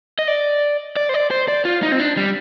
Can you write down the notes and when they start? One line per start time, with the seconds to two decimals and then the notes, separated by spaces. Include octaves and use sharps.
0.19 D#5
0.28 D5
0.96 D5
1.09 C5
1.14 D5
1.31 C5
1.48 D5
1.65 F4
1.83 D#4
1.92 C4
2.00 D4
2.17 G3